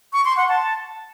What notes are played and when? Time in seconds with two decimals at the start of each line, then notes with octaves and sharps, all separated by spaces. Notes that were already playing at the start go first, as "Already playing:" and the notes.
0.13 C#6
0.25 C6
0.37 F#5
0.49 A5